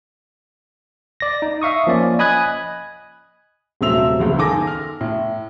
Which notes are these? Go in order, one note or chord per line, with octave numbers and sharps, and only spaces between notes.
D5 A#6
D#4
E5 F5 C#6 D#6
F3 A#3 C#4 D5
D#5 G#5 B5 D#6 F#6 G#6
D#1 C3 F#3 A3 E6 F7
F#1 C#2
D#3 A4 G#5 D6 A#6
F6
A2